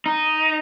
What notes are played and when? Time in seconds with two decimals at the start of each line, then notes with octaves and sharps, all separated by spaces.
0.06 D#4